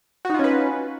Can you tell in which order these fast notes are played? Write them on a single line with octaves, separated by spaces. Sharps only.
F#4 D#4 F4 C#4 B4